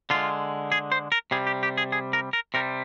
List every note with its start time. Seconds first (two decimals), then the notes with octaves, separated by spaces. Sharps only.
0.10 D3 G#3 F4
0.72 G#4
0.92 C5
1.12 A#4
1.31 C3 G3 G#4
1.47 G4
1.63 G4
1.78 G#4
1.92 G#4
2.13 A#4
2.33 A#4
2.54 C3 G3 A#4